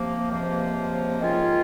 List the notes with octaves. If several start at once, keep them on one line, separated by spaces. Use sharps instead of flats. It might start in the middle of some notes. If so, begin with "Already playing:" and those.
Already playing: C3 F3 A#3
C#2 C3 F3 A#3
D#3 G#3 C#4 F4